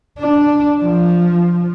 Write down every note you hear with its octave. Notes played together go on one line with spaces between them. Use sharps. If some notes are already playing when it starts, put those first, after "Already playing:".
D4
F3